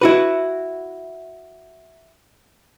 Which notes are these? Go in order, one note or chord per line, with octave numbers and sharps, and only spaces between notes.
E4 F#4 B4